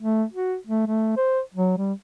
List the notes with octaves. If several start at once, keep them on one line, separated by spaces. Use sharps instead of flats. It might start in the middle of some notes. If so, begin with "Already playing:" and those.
A3
F#4
A3
A3
C5
F#3
G3